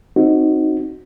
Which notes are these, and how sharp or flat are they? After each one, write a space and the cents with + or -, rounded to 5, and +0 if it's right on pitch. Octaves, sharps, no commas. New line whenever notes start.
C4 +15 D#4 +0 F#4 +0